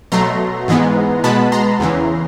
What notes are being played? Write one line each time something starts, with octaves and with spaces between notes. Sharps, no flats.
B2 F#3 A3 A#5 C6
G#2 E3 G#3 B3
B2 G#3 B3 A5 B5
A#5 C6
E2 C#3 E3